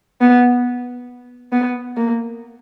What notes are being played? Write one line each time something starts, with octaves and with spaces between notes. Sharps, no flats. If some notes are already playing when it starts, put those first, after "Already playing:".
B3
B3
A#3